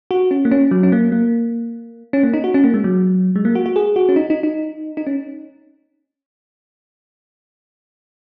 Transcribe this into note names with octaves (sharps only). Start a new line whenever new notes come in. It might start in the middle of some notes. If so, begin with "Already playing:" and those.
F#4
C#4
A#3
C#4
F#3
C#4
A#3
A#3
C#4
A#3
D#4
F#4
C#4
A#3
G#3
F#3
G#3
A#3
F#4
F#4
G#4
F#4
C#4
D#4
D#4
D#4
D#4
C#4